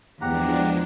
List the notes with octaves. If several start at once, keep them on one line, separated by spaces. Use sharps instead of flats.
E2 F3 G#3 D4 G4 F#5 A#5